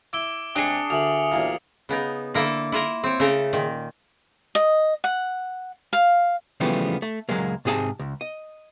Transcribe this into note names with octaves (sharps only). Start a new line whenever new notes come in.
E4 D6 D7 G7
C3 G#3 D4 G#4 D#6 C7 C#7
D2 E5 G#5 D#6 F7 F#7
B1 E2 A#2
C#3 B3 D#4
D3 A#3 E4 A4
E4 F4 A#4
C4 C#5
C#3 A3 A4 A#4
A#2 D#3
D#5
F#5
F5
C#3 E3 F3 G3 A3 B3
A3
C#2 F#3 G#3 A#3
G#2 C3 G#4 D5 A5
C#2
D#5